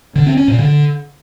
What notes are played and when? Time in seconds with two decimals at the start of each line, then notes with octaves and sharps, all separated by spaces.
0.16 D3
0.26 C4
0.37 C#4
0.48 A#2
0.59 D3